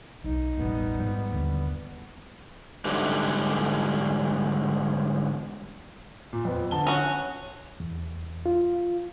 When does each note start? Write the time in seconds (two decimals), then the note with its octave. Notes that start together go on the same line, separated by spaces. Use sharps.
0.24 B1 D#4
0.57 E1 A1 G3 B3
0.99 G#2 F3
1.32 D#2 D3
2.85 G#2 D3 E3 F#3 G3
6.33 A#2
6.45 F2 B3
6.71 D3 A5 G7
6.87 C#4 F#4
7.80 E2
8.46 F4